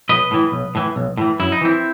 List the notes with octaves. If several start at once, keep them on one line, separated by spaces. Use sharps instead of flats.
B1 B4 D#5
A2 E3
B1
A2 E3
B1
A2 E3
F#2 E4
D#4
E3 C4 E4